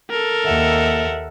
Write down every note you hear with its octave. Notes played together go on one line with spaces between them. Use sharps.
A4 A#4
D#2 E5 F#5